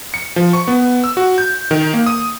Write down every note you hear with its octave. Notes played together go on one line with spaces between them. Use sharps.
C#7
F3
C#6
B3
E6
F#4
G6
D#3
A#3
D#6